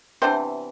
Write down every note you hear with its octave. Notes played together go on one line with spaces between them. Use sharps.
C3 E3 B3 D4 C5